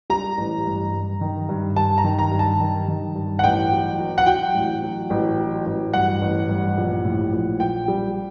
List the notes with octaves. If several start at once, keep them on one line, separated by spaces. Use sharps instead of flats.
G3 A#5
A1
G2
G2
D#3
G2
G2 A5
A#5
D#3
A#5
G2
A5
D#3
D#3
G2
F#5
A1 G5
F#3
F#3
F#5
F#3 G5
A1
F#3
A1
F#3
A1
G2 F#5
A1
G2
A#1
A2
A#1
A#1 G5
G3